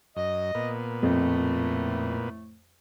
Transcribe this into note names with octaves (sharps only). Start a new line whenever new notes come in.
F#2 D#5
A#2 B3
F2 A2 A3